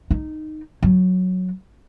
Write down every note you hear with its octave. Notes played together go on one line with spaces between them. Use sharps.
D#4
F#3